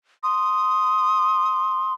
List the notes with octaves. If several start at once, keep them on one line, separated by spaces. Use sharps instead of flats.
C6 D#6